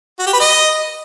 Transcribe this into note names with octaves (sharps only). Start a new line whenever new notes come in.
F#4
G4
B4
D#5